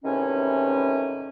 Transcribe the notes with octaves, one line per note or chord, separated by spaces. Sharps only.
E2 A2 C3 D#3 C#4